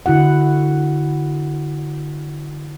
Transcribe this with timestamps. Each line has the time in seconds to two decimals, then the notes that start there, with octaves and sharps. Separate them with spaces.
0.06 D3 E4 F#4 F#5